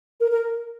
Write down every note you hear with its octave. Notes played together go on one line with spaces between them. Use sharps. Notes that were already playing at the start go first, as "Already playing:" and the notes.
A#4
A#4